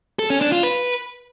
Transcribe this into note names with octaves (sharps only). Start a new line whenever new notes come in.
A4
C#4
D4
F4
B4